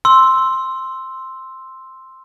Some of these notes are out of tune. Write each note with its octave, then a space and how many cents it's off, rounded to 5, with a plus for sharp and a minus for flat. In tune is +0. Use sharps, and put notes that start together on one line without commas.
C6 +0 E6 +0